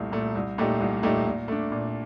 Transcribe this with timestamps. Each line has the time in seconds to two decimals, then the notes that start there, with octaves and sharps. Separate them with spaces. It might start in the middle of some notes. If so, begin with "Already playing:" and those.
Already playing: C2 A#2 A3
0.12 A#2 A3
0.35 C2
0.58 A#2 A3 D#4 G4
0.80 C2
1.03 A#2 A3 D#4 G4
1.26 A#2
1.48 A3 D4
1.72 A#2